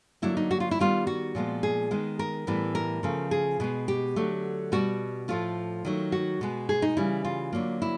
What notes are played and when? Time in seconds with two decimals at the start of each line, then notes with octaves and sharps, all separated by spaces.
0.22 D3 F#3 A#3 E4
0.37 D#4
0.51 F#4
0.60 F4
0.71 E4
0.79 D#3 G3 B3 F4
1.07 F#4
1.35 A#2 F3 G#3 B3
1.63 G#4
1.91 D#3 G#3 B3
2.19 A#4
2.47 A2 E3 G3 B3
2.75 A#4
3.03 C#3 F3 A3
3.31 G#4
3.60 B2 G#3 B3
3.88 G4
4.16 D3 F#3 A3
4.72 B2 G3 B3 F#4
5.28 A2 F3 A3 F4
5.85 D#3 F#3 A3
6.12 F#4
6.41 B2 G#3 B3
6.69 G#4
6.82 D#4
6.97 C#3 E3 G3 E4
7.25 F4
7.53 D3 F#3 A#3
7.82 E4